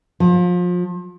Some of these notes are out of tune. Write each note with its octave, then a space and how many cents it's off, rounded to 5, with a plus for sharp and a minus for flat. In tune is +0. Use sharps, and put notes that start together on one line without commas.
F3 +30